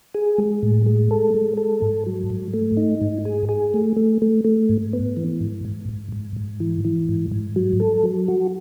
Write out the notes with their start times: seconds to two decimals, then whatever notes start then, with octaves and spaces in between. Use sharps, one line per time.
0.15 G#4
0.38 G#3
0.63 A2
0.86 G#3
1.11 A4
1.34 G#3
1.57 A4
1.82 G#2
2.06 F#3
2.30 G#2
2.54 A3
2.77 D#4
3.01 G#2
3.25 G#4
3.49 G#4
3.74 A3
3.97 A3
4.22 A3
4.45 A3
4.69 G#2
4.93 B3
5.17 E3
5.41 G#2
5.65 G#2
5.89 G#2
6.12 G#2
6.36 G#2
6.60 E3
6.85 E3
7.09 G#2
7.32 G#2
7.56 F#3
7.80 A4
8.03 F#3
8.28 F#4